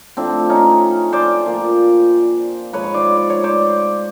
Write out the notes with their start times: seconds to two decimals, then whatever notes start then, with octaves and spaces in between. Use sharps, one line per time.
0.17 A2 F3 C4 D4
0.49 C#4 D#4
1.13 C5 D5
1.46 A#2 F3
2.73 G#2 F3 B4 C#5
2.84 C#5
2.94 C5 D5
3.16 D5
3.30 C#5
3.44 C5 D5